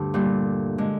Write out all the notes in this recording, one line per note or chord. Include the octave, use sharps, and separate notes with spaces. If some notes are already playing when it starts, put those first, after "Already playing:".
Already playing: D2 G2 D3
A#2 G3
D3 G#3